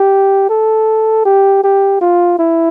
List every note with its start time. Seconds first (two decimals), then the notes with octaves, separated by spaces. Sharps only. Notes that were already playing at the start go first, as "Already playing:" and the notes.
Already playing: G4
0.49 A4
1.25 G4
1.63 G4
2.01 F4
2.39 E4